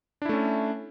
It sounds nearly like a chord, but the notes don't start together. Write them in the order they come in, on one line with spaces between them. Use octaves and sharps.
D4 E4 A3 C#4